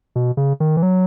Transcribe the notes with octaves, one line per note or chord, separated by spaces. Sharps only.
B2
C#3
D#3
E3
F#3